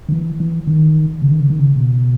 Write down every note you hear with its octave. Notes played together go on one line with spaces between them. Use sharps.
D#3
E3
E3
D#3
C#3
D#3
C#3
D#3
C#3
B2